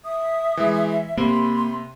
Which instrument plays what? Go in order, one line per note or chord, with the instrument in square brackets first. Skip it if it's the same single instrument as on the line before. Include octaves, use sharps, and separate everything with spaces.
[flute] E5 [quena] D#6
[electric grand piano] E3 G#3
[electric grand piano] C3 [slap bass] A#3 [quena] B5 [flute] C6